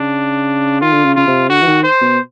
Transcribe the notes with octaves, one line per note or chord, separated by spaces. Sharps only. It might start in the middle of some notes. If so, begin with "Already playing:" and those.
Already playing: C#3 D4
D#3 F4
D3
C#3
C#3 F4
C3
D3 F#4
E3
D#3
C5
B2